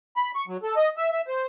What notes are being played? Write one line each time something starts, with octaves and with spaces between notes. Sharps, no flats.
B5
C#6
F#3
A4
D#5
E5
E5
C5